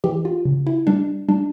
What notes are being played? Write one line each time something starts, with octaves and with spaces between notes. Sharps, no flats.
E3 G4
F4
C#3
E4
G3 D4
G3 D4